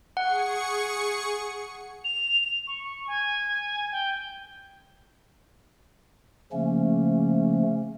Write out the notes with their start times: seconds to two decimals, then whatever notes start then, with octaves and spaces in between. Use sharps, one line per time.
0.17 G#4 F#5 C#6 C#7
2.04 F7
2.67 C#6
3.07 G#5
3.92 G5
6.52 C#3 F3 A3 A#3 C#4